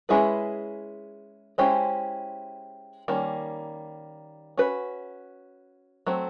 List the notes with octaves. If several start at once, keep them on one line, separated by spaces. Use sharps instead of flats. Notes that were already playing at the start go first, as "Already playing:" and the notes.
G#3 C#4 E4 G#4 B4
G#3 C#4 E4 G4 C5
D#3 G3 A#3 C#4
C#4 F#4 B4
F#3 A3 C4